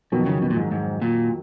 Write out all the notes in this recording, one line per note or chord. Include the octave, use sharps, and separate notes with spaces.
F2 B2 D#3 F#3
C#3
B2
A#2
G#2
G#2
A#2